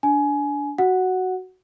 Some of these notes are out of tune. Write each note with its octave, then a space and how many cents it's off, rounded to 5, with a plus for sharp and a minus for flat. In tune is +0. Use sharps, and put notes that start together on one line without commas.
D4 -15 G#5 +20
F#4 +5 F#5 +0